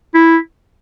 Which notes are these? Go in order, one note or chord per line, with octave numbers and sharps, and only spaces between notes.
E4